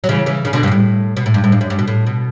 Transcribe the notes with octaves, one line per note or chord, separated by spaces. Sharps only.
F#3
C#3 E3
C#3 E3
C#3
B2 D3
G2
B2
A2
B2
A2
G2
A2
G2
F#2
G2
B2
A2
B2